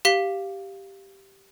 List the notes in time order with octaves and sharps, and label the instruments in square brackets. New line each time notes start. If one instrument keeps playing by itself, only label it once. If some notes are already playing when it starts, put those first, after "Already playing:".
[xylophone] G4 F5 B6 G7